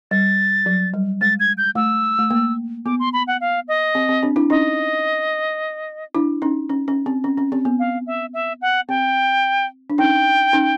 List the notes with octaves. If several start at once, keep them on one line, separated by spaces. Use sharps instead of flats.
G3 A6
F#3
G3
G#3 A6
G#6
G6
A3 E6
A3
A#3
B3 D6
C6
B5
F#5
F5
D#5
C4
C4
C4 D4
D4 E4
C#4 D#4 D#5
D4 E4
C#4 D#4
C#4
C#4
C4
C#4
C#4
C4
B3
F5
E5
E5
F#5
C4 G5
D4
C#4 D#4 G5
C#4 D#4